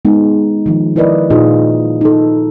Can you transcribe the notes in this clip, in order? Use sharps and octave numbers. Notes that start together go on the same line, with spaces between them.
G#3 B3 D#4
D#3 F3
E4 A#4 B4 D5 D#5
A#2 D#4 F4 G#4 D#5
D#4 A4